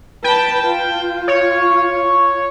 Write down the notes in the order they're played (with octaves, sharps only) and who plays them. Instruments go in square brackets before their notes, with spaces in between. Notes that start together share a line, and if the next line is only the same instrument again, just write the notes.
[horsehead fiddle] B4 A5 [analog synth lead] G5
[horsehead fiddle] F4
[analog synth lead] C#5